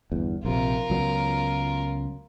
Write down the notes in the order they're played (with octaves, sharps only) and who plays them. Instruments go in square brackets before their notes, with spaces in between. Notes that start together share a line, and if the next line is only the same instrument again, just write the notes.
[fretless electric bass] G1 E2
[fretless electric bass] A#1 C3 [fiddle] F4 A#4
[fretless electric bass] C#2 F#3 B3